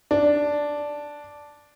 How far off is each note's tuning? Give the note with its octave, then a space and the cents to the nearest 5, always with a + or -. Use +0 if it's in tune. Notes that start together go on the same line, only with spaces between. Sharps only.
D4 -5